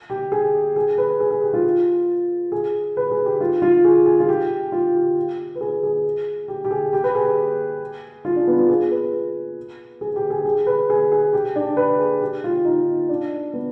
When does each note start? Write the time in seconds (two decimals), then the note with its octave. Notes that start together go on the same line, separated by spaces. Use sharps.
0.10 G4
0.32 G#4
0.76 G#4
0.98 B4
1.20 G#4
1.31 G#4
1.42 G4
1.54 F4
2.52 G#4
2.97 B4
3.11 G#4
3.25 G4
3.41 F4
3.62 F4
3.85 G#4
4.06 G#4
4.20 F4
4.29 G4
4.72 F4
4.95 G4
5.55 B4
5.61 G#4
5.83 G#4
6.48 G4
6.65 G4
6.71 G#4
6.93 G4
7.04 B4
7.15 G#4
8.25 F4
8.36 D4
8.47 B3
8.58 F4
8.69 G#4
8.91 B4
10.01 G#4
10.16 G4
10.30 G#4
10.45 G#4
10.67 B4
10.90 G#4
11.12 G#4
11.33 G4
11.56 D4
11.77 B4
11.99 G#4
12.21 G4
12.44 F4
12.65 D#4
13.09 D4
13.53 B3